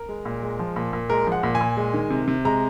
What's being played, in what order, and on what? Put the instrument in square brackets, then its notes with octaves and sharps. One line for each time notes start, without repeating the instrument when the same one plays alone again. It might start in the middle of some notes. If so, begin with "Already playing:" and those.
Already playing: [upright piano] A#4
G#3
A#2
G#3
F3
A#2
A#2
G#3 A#4
F3
F#5
A#2
G#5
A#2
G#3
D#3
C3
C3
G#3 A#5